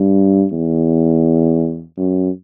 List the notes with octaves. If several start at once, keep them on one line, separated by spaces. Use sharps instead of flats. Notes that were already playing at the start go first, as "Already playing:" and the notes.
Already playing: G2
E2
F#2